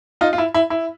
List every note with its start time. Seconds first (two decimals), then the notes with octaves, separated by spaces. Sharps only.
0.21 D#4 F4
0.33 F4
0.38 E4
0.54 E4
0.70 E4